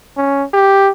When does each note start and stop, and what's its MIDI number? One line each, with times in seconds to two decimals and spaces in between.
0.17 0.44 61
0.53 0.90 67